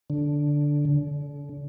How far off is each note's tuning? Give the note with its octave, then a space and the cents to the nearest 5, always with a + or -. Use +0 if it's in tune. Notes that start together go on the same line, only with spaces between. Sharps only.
D3 -5
D3 -40